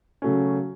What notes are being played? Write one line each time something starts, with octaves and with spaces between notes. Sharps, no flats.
C#3 F#3 A3 C#4